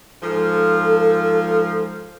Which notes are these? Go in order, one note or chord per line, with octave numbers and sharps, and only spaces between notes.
G#2 F3 A4